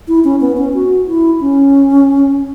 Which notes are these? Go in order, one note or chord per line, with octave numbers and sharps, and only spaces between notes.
E4
C#4
B3
C#4
F#4
E4
C#4